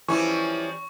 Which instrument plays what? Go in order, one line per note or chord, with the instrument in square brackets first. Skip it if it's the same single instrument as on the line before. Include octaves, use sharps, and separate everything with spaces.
[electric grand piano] E3 [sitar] F3 G3 C#4 [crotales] C#6